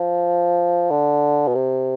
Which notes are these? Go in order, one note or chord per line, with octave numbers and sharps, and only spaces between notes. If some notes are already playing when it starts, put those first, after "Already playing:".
Already playing: F3
D3
B2
C3